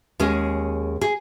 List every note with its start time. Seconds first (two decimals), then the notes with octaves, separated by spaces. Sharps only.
0.19 D#2 G#3 C#4 G#4
1.01 G#4